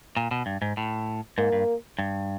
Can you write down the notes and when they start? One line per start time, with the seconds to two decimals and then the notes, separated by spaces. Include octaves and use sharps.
0.17 A#2
0.31 B2
0.46 G2
0.62 G#2
0.77 A2
1.38 G#2 A#3
1.52 G2
1.99 G2